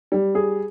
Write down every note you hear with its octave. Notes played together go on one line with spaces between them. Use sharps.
G3
G#4